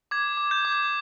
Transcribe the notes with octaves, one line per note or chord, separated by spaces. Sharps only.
D6 G#6
D6
G6
D6
G6